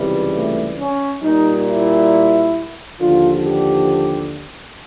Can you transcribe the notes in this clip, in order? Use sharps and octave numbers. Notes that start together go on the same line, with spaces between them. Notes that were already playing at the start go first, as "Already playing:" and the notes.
Already playing: C#2 C3 E3 G3
A3
C#4
A#2 G3 D#4
E4
D#2 D3 F3 F4
G4